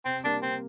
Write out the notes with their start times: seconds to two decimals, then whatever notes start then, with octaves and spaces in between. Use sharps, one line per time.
0.05 C3 C4
0.24 G3 A#3 D4
0.42 C3 C4